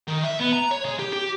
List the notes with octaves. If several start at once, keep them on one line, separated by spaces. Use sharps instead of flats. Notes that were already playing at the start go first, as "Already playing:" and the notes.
D#3
E5
B3
A#5
C#5
G#3
G4
G4